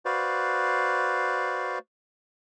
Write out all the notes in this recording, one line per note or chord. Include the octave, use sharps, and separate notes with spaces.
F#4 B4 C5 D5 F5